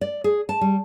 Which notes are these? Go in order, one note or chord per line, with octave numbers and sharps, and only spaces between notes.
D5
G#4
A5
G3